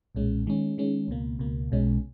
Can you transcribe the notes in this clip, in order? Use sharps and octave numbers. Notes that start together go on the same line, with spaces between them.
B1 A#2 G#3 C#4
D#3 G#3 C#4
D#3 G#3 C#4
C#2 B2 A#3
C#2 B2 A#3
B1 B2 G#3 C#4